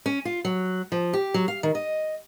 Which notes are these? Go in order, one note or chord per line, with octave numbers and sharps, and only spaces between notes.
C#4
F4
F#3
F3
G4
F#3
F5
D#3
D#5